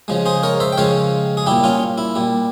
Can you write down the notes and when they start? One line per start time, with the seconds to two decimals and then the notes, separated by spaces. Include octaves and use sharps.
0.08 C#3 F3 G#3
0.26 G#4 C5
0.43 A#4 C#5
0.60 C5 E5
0.72 G5
0.77 C#3 F3 G#3 C#5 F5
1.37 G#4
1.46 A#2 G3 E4 G4
1.64 C#4 F4
1.98 E4
2.15 A#2 G3